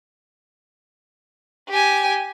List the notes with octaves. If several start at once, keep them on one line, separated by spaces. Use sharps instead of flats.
G4 G#5